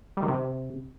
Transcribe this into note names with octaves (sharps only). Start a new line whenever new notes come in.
G3
D#3
C3